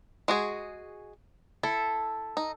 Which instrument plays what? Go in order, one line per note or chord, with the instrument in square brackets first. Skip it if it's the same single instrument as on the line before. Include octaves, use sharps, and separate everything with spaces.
[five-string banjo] G#3 F#4 G#4
[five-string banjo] E4 [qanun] A4
[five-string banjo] D#4